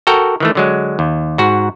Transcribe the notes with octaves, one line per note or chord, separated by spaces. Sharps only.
F#4 A4 A#4 G5
D#3 E3 A3
D3 F#3 G#3
D#2
G#2 F#4